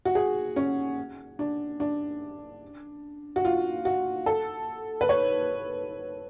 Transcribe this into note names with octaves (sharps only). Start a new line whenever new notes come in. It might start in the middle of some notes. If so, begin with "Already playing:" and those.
F#4
G#4
C#4
D4
D4
F#4
F4
F#4
A4
B4
C#5